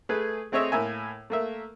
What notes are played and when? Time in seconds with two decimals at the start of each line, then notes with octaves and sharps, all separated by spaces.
0.09 A3 G#4 B4
0.52 A3 C4 G#4 C#5 D#5 E5
0.72 A2 A#3 E5 G#5
1.30 A3 A#3 E5